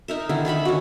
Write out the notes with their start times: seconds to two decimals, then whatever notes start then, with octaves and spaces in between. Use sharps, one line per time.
0.08 D#4 A#4 E5
0.29 D3 D#3 E4
0.45 D#3 D4 E5 B5
0.65 C#4 F#4